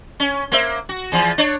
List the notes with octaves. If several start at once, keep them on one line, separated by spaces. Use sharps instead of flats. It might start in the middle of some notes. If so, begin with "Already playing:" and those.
C#4
A#3 C5 E5
F#4
E2 F3
D4 C#5